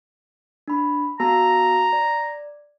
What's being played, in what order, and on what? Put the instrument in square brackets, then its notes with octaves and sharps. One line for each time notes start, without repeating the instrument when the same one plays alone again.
[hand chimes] D4 B5
[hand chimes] B3 F#4 A5 [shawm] A#5
[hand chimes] D5